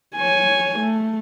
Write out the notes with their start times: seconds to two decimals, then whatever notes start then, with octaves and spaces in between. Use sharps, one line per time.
0.16 C#5 G#5
0.79 A3